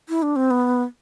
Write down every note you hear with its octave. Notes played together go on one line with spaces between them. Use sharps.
E4
D4
C4
B3